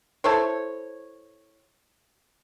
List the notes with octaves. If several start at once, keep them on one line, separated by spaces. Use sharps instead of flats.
E4 A4 C5 C#5